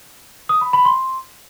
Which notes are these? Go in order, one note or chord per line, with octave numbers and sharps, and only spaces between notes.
D#6
B5
B5
C6